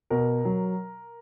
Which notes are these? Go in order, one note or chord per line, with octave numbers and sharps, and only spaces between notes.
B2 A#4
F#3